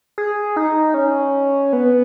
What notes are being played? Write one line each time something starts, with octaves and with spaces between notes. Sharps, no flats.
G#4
D#4
C#4
B3